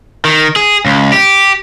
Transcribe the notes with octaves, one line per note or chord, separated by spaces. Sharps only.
D#3
G#4
C#2
G4